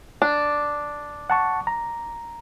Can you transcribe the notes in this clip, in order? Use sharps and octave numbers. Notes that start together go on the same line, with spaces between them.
D4
F#5 A5 C#6
A#5